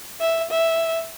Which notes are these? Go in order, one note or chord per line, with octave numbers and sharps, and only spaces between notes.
E5
E5